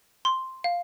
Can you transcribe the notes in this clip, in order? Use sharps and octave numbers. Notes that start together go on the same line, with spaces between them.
C6
F5